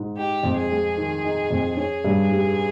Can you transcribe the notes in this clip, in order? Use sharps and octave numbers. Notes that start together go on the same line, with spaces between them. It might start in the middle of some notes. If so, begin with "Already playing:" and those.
Already playing: G#2
D#4 G4
F2
G#4
G#3
D#3
D#4
F2
C#4 G#4
G2
G3